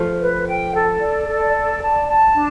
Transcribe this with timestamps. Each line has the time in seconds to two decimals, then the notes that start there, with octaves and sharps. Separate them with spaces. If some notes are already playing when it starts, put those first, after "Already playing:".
Already playing: F3 A3
0.20 B4
0.47 G5
0.74 A4
1.00 D5
1.27 A4
1.53 D5
1.80 A5
2.07 A5
2.33 D4